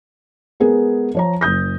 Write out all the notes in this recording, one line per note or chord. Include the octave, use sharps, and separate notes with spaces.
G#3 B3 G#4 A#4
F3 C#5 A#5
F#1 D#6 G6 A#6